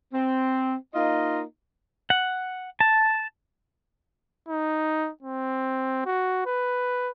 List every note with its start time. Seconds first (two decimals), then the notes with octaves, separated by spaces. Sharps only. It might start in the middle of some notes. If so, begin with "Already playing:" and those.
0.13 C4
0.95 A#3 D#4 F4 D#5
2.10 F#5
2.80 A5
4.48 D#4
5.23 C4
6.06 F#4
6.46 B4